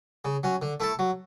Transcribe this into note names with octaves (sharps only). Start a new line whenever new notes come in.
C#3
F#3 C#4
D3
A3 E4 A4
F#3